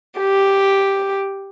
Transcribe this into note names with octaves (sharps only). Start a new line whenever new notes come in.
G4